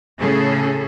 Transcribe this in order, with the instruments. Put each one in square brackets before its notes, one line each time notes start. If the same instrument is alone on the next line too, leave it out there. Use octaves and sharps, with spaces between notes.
[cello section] A2 C#3 C#4 G#4 A4